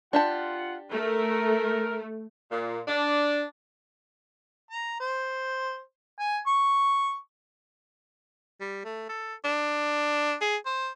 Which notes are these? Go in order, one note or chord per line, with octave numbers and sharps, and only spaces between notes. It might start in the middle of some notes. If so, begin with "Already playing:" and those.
D4 F4 G4 F#5 A5
A3 A#4
A#2
D4
A#5
C5
G#5
C#6
G3
A3
A4
D4
G#4
C5